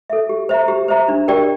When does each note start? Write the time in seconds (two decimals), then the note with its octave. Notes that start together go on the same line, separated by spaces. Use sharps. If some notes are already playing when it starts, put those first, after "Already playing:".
0.10 A4 E5
0.29 G4
0.49 C5 E5 A#5
0.68 G4
0.88 C5 E5 A#5
1.08 D4
1.28 G4 A#4 D5 G5